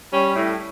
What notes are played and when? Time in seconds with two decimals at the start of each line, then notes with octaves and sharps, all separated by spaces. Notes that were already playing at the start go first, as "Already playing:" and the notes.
0.13 G3 C#4
0.36 A2